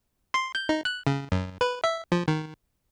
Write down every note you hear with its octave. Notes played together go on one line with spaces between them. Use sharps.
C6
G6
D#4
F#6
C#3
F#2
B4
E5
F3
D#3